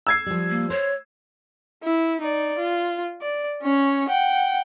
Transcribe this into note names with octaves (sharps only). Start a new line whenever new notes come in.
E6 G#6 C7
F3 G3
A#3
C5 C#5
E4
D#4 D5
F4
D5
C#4 C#5
F#5 G5